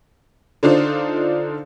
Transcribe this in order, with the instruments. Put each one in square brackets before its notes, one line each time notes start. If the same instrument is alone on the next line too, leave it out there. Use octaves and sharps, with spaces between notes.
[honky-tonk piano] D3 D4 D#4 F4 C5